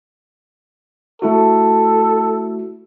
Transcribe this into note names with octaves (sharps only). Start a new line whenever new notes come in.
A3 E4 F#4 A4